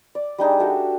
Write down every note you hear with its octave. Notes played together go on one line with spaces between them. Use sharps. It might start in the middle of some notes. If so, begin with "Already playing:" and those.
D5
G3 D4 D#4 G#4
F#4 G4 A4 E5